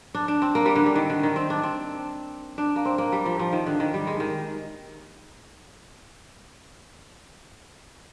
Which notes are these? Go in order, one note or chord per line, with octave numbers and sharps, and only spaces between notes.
D4
D4
C4
A#3
G3
D3
D3
D#3
D3
D#3
C4
D4
C4
D4
A#3
C4
A#3
G3
F3
F3
D#3
D3
D#3
G3
G#3
D#3